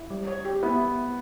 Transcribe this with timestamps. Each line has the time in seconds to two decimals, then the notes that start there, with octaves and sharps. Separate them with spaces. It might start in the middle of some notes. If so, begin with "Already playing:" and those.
Already playing: E4
0.10 G3
0.27 C#5
0.45 G4
0.63 B3 E4